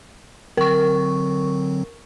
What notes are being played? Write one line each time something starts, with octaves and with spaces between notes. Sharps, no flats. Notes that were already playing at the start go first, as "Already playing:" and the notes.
D3 F#3 C4 A#4 C#6